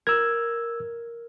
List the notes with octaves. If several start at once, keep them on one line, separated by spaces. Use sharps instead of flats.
A#4 E6 G#6